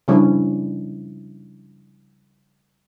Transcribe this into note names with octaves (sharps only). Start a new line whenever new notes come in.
C#3 F3 G3 C#4 D4 E4